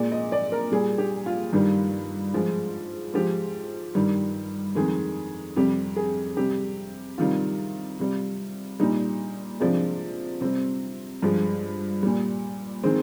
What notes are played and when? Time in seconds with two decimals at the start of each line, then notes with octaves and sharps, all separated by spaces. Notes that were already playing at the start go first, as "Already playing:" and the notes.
Already playing: A#2 G#3 D5
0.12 D#5
0.32 D5
0.52 A#4
0.72 A#2 G3 G#4
0.98 G4
1.26 F4
1.53 G2 D#3 G3
2.34 G#2 F3 G#3
3.14 G#2 F3 G#3 G4
3.95 G2 D#3 G3
4.75 F2 D#3 G#3 G#4
5.56 F2 C3 G3 G4
5.96 G#4
6.37 C3 G3 G4
7.18 C3 D#3 G3 F4
7.99 C3 G3
8.80 A#2 G3 D#4
9.60 C3 F3 G#3 D4
10.41 C3 G3 C4
11.22 G2 F3 G#3
12.03 A#2 G3
12.83 D#3 G#3 C4